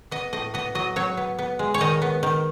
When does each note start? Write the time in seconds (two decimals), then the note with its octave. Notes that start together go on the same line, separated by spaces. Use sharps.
0.11 B3 D#5
0.33 A2 D#5
0.54 B3 D#5
0.75 F#3 D#5
0.96 F#3 C#5
1.17 B3
1.39 B3
1.59 G#3
1.74 C#5
1.81 D#3 D#5
2.02 B3
2.23 D#3